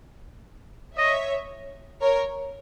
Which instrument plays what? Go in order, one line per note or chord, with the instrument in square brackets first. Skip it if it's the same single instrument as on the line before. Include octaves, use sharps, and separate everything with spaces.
[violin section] C#5 E5 [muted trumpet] D#5
[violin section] A#4 C#5